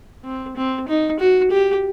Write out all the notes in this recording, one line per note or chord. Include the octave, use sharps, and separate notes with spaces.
C4
C4
D#4
F#4
G4